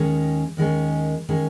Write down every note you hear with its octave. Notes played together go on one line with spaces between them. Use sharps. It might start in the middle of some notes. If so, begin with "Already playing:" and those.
Already playing: D#2 D#3 G#3 C#4
D#2 D#3 G#3 C#4
D#3 G#3 C#4